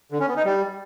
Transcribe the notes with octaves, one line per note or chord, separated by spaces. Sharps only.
D3
C#4
B3
D#4
G3